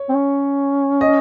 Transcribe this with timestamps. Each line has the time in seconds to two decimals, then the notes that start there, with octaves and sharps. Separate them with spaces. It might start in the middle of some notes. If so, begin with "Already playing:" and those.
Already playing: C#5
0.09 C4
0.14 C#4
1.01 D#5